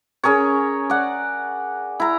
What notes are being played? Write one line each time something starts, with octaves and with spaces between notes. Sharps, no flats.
C#4 G#4 A#4 C#5
D5 F#5
E4 A#5